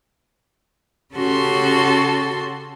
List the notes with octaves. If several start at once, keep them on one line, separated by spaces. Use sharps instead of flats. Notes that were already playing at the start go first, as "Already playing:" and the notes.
C#3 C#4 F#4 G4 A4 C6